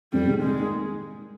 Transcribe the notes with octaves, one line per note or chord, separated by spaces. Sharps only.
F2 G3
C3 D#3 G#3
D#3 G#3
A#3 D#4